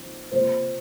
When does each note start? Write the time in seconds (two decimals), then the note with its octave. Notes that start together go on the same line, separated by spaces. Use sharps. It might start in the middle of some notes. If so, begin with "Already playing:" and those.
Already playing: F3 C4 D#4
0.32 C3 F3 A#3 C5